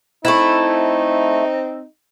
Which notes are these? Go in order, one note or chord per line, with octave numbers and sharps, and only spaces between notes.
A3 C4 D#4 E4